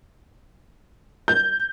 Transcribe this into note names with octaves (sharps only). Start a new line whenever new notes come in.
G6